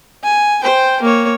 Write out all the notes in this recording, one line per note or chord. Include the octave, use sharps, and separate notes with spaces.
G#5
C5 G5
A#3 C#5